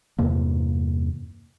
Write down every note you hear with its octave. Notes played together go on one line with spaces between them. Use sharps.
E2 G2 C3 A#3